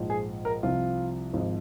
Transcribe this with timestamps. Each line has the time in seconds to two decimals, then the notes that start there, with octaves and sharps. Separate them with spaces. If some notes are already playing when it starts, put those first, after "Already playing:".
Already playing: A#1 G#2 F3
0.10 G#4
0.45 A#4
0.63 C2 C3 F3 F4
1.33 G#1 G#2 F3